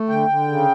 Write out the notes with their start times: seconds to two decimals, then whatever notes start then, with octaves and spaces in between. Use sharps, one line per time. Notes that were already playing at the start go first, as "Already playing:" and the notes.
Already playing: A3
0.09 D3 G5
0.28 D3
0.48 C#3